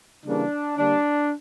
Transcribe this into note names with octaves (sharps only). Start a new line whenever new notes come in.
C#3 E3 G3 A#3 D4
D3 G3 A#3 D4